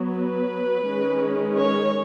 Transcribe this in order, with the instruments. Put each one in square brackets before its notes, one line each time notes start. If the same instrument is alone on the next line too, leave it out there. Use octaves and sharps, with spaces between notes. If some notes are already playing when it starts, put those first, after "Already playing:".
Already playing: [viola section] F#3 B3
B4
D#3 G#3 C#4
C#5